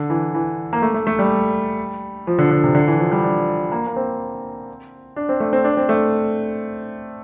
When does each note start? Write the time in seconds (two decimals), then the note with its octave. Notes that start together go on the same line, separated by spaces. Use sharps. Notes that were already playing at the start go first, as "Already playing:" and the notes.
Already playing: D3
0.10 E3
0.34 E3
0.73 A#3
0.82 A3
0.94 A3
1.07 A3
1.19 G3
2.27 F3
2.39 D3
2.51 D3
2.64 C3
2.75 D3
2.87 E3
2.99 F3
3.12 G3
3.24 D4
3.72 A#3
3.87 A#3
3.96 C4
5.16 D4
5.29 C4
5.40 A3
5.53 C4
5.64 D4
5.77 C4
5.89 A3